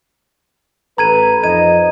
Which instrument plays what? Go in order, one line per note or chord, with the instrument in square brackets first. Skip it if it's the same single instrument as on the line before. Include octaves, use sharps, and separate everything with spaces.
[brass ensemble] A1 A4 B4 [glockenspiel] A#5 G#6 D#7
[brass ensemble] F2 D#4 D#5 [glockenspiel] G#6 D#7